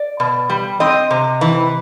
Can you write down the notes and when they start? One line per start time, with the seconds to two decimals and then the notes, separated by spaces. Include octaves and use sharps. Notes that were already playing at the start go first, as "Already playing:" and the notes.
Already playing: D5
0.20 B2
0.50 G3
0.80 C4 D#5
1.11 C3
1.41 E3